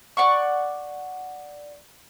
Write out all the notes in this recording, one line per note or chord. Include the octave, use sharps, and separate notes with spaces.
D5 F#5 C#6